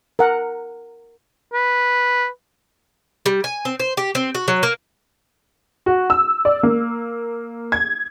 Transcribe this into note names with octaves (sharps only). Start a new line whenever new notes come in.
A#4 F#5
B4
G3
G#5
C4
C5
G4
C4
F#4
F#3
A#3
F#4
E6
D5
A#3
G#6